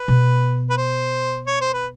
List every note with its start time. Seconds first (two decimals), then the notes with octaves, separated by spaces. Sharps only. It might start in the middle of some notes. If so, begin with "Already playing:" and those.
Already playing: B4
0.08 B2
0.70 B4
0.77 C5
1.47 C#5
1.61 C5
1.73 B4